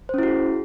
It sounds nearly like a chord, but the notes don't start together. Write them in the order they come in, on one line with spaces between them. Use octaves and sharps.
C5 C#4 E4 F#4 G#4